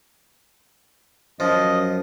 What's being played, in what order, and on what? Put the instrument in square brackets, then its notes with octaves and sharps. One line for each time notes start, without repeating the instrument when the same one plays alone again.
[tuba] F#2 [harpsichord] F3 [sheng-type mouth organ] D#5